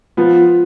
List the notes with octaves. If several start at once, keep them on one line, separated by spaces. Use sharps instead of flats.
F3 B3 F4